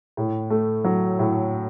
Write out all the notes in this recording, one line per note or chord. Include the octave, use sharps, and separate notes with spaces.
A2
A3
F#3
A2